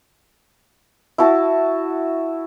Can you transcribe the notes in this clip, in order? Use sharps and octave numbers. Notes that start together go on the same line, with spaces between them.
E4 F#4 A5